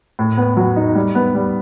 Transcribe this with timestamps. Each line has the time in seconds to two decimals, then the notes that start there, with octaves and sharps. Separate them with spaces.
0.19 A2
0.37 B3
0.57 F#3
0.76 D#4
0.95 G3
1.15 B3
1.35 G3